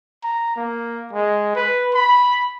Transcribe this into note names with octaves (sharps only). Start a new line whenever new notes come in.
A#5
A#3
G#3
B4
B5